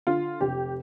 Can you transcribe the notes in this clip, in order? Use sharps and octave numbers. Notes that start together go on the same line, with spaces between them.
D3 F4
F1 G4